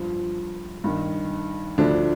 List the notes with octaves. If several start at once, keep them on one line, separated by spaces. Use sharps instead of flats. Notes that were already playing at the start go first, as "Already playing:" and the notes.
Already playing: G2 F3
G2 D#3
D2 D3 F3 D4